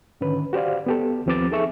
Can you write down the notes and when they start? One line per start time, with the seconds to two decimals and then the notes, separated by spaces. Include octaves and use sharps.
0.21 G#2 D3 D#3 C#4 B4
0.53 F#4 G4 C5 D5 F5
0.86 B3 G4 A4
1.26 D#2 F3 C4 B4 D6 A6
1.51 D#4 G#4 A4 E5 C#6